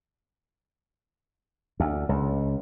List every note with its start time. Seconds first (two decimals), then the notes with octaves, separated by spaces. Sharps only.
1.80 D2
2.09 C#2